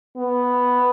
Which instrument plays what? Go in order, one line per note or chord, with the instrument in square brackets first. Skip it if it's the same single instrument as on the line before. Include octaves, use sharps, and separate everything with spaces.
[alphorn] B3